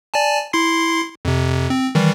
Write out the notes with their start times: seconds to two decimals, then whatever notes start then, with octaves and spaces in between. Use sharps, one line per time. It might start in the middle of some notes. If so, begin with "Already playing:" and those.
0.14 D5 G#5 A5
0.53 E4 C6 C7
1.25 F2 C3
1.70 C4
1.95 D#3 E3 G3